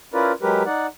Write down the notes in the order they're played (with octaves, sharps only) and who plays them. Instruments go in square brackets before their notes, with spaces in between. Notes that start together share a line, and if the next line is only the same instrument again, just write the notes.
[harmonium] C#4 E4 F4 A#4 B4 D5
F#3 G#3 G4 A#4 B4
D#4 D5 F#5